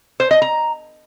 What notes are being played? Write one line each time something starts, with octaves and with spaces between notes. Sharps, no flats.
C5
D#5
A#5